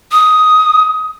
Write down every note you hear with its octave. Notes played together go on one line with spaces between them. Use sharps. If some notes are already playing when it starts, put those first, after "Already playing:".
D#6